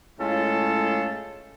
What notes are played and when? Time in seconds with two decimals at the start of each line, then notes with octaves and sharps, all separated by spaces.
0.20 A2 G#3 C#4 F4 A4